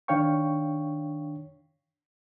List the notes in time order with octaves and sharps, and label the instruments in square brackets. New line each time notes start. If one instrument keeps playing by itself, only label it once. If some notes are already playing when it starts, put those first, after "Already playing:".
[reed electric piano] D#3 D4 C#5 F5 G5 C#6